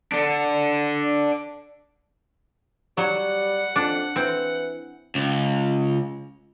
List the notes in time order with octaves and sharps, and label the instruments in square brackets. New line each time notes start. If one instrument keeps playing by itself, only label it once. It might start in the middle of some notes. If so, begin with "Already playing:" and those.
[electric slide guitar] D4 A4
[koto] F#3 [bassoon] G3 [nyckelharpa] F#5
[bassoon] F2 [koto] D4
[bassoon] E3 [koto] C4
[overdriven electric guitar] C#2